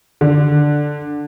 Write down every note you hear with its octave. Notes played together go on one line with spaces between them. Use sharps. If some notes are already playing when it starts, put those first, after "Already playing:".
D3